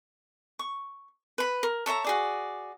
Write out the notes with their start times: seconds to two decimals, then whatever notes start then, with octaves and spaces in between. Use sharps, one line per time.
0.59 C#6
1.38 B4 B5
1.63 A#4
1.86 A4 C#5 E5 A#5
2.04 F#4 G#4 D5